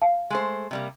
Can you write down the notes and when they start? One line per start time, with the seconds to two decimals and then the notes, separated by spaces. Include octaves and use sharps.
0.02 F5 A5
0.30 G#3 A3 C5
0.71 C3 G3 A#3